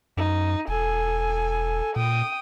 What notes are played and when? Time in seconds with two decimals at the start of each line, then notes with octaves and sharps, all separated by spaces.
0.17 F#2 D#4
0.68 E1 A4 G#5
1.96 A#2 G5 D#6